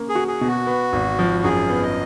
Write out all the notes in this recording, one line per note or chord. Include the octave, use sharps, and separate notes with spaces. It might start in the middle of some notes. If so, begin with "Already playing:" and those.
Already playing: A#3 C#4
G#4
F#4
G#4
B2
F#4
B3
G#1
F3
F#2 G#4
B3
D#5